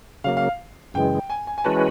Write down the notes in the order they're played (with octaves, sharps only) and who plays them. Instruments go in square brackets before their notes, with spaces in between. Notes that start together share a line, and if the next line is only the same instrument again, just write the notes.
[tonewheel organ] C#3 F#3 A#3 [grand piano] F5
[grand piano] F5
[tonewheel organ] F#2 C#3 E3 G#3 [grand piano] G5
[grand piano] G#5
G#5
G#5
[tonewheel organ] E3 G#3 C#4 F#4 B4 [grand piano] A5